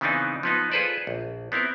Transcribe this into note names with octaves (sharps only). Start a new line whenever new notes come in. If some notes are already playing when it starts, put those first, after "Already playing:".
C#3 E3 B3 C4 D4 D#4
F3 B3 D#4
F4 G#4 A4 B4 C5 D5
A#1
B3 C4 E4 A#4